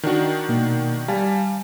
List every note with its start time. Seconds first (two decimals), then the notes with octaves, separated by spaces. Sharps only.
0.03 D#3 D4 F#4
0.49 B2 A#3
1.08 G3 F5 G#5 A5